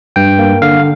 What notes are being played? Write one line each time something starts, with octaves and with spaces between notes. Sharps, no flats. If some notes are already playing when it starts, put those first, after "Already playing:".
G2 G5
A#3
D3 F5